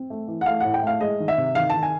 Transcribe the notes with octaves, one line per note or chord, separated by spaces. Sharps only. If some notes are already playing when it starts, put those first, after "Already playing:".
Already playing: C4
A3
E3
F#5
A3 F5
A2 F#5
G5
A3 F5
G#3 D#5
D#3
E5
C3
D#3 F5
D#3 A5
G#5